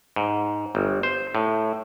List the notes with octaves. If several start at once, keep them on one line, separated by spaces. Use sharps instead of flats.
G#2
G1
C5
A2